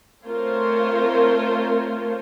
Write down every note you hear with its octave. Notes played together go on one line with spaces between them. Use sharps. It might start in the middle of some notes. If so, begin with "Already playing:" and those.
A3 C4 F4 A#4 C5 C#5